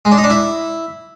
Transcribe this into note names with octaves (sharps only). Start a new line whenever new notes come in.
G#3
D4
D#4
D4
E4